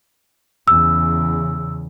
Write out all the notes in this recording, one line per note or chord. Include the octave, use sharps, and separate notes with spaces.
E2 C#3 E6